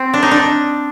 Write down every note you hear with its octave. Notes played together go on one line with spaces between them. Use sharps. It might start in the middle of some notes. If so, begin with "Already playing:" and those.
Already playing: C4
D4
D#4
D4